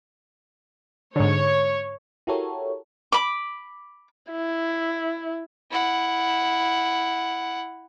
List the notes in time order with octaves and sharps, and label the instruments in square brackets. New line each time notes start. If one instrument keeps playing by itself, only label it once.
[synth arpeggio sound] G#2 D3 [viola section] C#5
[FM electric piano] E4 F#4 G4 A4 A#4 C#5
[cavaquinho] B5 D6
[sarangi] E4
[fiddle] E4 F#5